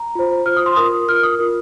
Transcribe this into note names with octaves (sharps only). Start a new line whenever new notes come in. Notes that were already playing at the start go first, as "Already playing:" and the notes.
Already playing: A#5
F4 C5
F4 C5 F6
D#6
C6
F4 A#4 D#6
F4 A#4 F6
D#6
F4 A#4